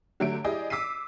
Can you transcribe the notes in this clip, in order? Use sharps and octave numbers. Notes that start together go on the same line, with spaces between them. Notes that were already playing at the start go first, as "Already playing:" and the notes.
D3 F#3 A3 G4 D7
E4 G4 G#4 D5 D#5
D6 E6 B6 C7 D#7